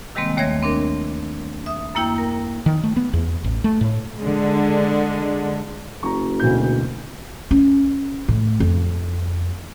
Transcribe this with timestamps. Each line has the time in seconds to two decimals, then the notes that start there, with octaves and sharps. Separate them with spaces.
0.15 C3 D#3 G3 G#3 A#3 C4
0.37 D#2 A3 C#5 E5 G#6 A#6
0.62 C4 D4 A#4
1.66 E5 D#6
1.95 F#2 A#3 E4 G5 G6
2.18 A#4
2.66 D#3
2.83 A3
2.96 B3
3.13 E2
3.44 A1
3.64 A3
3.81 A2
4.19 D3 G#3
6.03 F#1 A#5 C#6
6.40 D2 B2 G6
7.51 C#4
8.28 A2
8.60 F2